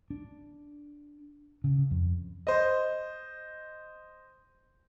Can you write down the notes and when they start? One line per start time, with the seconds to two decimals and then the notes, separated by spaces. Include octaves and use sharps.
0.10 D4
1.64 C#3
1.91 F2
2.47 C5 D#5